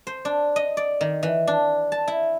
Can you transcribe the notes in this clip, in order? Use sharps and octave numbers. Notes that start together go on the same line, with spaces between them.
C5
D4
D#5
D5
D#3
E3
D4
A5
E4